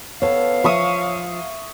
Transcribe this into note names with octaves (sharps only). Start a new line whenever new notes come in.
B3 A4 C#5 F5
F3 E5 C#6 D#6